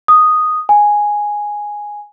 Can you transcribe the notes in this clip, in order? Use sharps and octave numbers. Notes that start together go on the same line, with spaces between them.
D#6
G#5